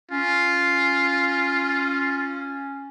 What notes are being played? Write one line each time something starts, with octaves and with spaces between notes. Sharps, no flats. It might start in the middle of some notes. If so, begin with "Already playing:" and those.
C#4 F4